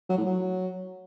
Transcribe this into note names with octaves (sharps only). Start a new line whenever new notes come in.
F#3
A2
F#3